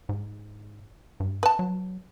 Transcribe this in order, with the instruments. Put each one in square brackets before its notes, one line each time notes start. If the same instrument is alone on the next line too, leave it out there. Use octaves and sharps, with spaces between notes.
[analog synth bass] G#2
G2
[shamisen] B4 A5
[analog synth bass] F#3